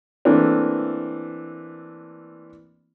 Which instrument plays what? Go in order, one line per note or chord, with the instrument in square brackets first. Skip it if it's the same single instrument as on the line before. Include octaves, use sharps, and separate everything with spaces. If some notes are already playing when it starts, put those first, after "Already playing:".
[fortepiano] E3 A3 A#3 C4 D4